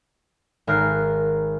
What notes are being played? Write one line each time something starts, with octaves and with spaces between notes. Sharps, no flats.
G#1 A#4 F6 F#6 C7